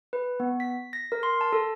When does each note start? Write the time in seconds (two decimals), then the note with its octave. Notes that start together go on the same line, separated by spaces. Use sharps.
0.13 B4
0.40 B3
0.60 B6
0.93 A#6
1.12 A#4
1.23 C6
1.41 A5
1.53 A4